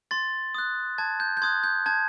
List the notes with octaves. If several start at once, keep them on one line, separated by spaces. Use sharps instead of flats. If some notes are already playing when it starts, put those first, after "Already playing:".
C6 A6
D#6 F#6
A5 G#6
G6
G6
C6 D#6 F#6 G#6
G6
A5 G#6